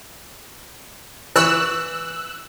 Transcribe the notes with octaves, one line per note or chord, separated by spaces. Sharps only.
E3 C#6 E6 F#6